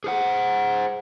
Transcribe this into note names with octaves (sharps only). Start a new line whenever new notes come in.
G#4 C5 F#5